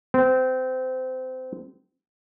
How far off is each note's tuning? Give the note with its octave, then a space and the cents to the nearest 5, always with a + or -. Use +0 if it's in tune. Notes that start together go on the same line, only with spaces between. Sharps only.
C4 -25